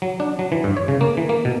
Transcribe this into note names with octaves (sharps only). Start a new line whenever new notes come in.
F#3
D4
F#3
E3
G2
C#5
C#3
A#3
E3
A#3
B2